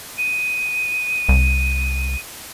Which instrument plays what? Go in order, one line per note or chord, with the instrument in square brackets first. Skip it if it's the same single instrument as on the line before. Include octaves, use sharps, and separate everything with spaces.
[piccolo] D#7
[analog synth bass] C2